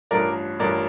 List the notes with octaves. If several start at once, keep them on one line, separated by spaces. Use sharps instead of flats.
A1 G2 F3 A#4 D5
A1 G2 F3 A#4 D5